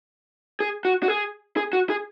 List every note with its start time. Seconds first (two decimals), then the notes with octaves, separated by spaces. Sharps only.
0.60 G#4
0.85 F#4
1.03 F#4
1.08 G#4
1.57 G#4
1.73 F#4
1.90 G#4